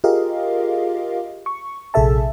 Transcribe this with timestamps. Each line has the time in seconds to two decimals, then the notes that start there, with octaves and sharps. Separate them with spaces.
0.04 F4 G4 G#4 A#4 D#5 F5
1.46 C#6
1.94 A#1 C3 G#4 A4 E5 A5